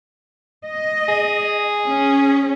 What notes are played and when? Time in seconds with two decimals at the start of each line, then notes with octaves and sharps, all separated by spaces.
0.65 D#5
1.08 G#4
1.86 C#4